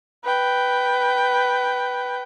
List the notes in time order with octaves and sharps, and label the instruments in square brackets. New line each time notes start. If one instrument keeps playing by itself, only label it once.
[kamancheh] B4 G5